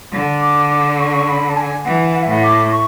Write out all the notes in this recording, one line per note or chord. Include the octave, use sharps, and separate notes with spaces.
D3
D6
D6
C#6
C#6
B5
A5
G#5
E3 F#5
F#5
E5
A2 F#5
D6
C#6